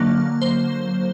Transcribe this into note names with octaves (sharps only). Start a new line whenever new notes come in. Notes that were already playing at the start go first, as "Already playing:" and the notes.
Already playing: D3 F#3 A#3
C5